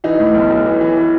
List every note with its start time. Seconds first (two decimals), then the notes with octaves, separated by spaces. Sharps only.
0.04 E3 D#4
0.20 A2
0.35 B1
0.50 B1
0.65 E3
0.81 E3
0.97 E3